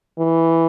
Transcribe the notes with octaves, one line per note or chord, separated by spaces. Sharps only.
E3